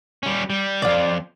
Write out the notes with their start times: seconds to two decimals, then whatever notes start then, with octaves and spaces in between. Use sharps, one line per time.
0.23 G3 C#4
0.50 G3
0.82 C2 F2 F4 D5